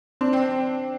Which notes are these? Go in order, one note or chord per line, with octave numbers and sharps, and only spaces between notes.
C4 D4
C4